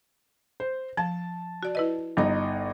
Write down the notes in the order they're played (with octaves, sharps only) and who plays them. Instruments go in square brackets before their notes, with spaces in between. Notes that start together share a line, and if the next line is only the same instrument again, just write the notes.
[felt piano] C5
[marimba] F3 [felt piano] A5
[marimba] F#4 D5
E4 B4 D#5
[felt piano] G1 D#4